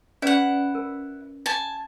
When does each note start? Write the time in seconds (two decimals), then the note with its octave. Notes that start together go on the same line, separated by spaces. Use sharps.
0.22 C#4 E4 B4 D5 F#5
0.75 A#4
1.46 G#5 A5